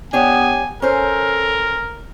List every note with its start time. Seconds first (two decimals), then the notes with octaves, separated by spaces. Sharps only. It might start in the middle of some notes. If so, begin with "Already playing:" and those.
0.13 B3 D4 G4 C#5 G#5
0.82 C#4 A4 A#4 C5